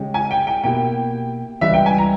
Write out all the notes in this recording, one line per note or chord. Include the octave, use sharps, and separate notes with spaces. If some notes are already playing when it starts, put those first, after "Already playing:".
Already playing: C#3 G#3 C#4 G4
G#5
G5
G5
B2 A#3 E4 G4 G5
C#2 C#3 E3 G3 E5
G5
G#5
A#5